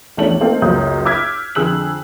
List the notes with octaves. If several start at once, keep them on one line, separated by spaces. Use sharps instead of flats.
A#1 E2 A3 C#4 D4 F#7
A3 A#3 C4 D#4 A4
C#2 F#2 A#3 D#6 G6
D6 E6 F6 G6 G#6 B6
F2 D3 G#4 E6 F#6 F#7